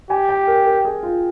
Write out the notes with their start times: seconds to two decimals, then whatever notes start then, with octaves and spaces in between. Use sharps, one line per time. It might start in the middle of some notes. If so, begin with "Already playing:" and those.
0.10 G4 G#5
0.29 G5
0.47 A#4
0.66 A#4
0.85 G#4
1.03 F4